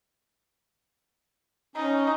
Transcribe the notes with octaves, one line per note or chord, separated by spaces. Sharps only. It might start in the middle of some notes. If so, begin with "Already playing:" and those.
C#4 D#4